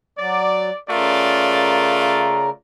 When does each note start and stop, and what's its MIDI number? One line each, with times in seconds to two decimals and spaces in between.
0.19 0.70 54
0.19 0.78 74
0.89 2.50 49
0.89 2.56 57
0.89 2.56 65
0.89 2.50 70
0.89 2.56 74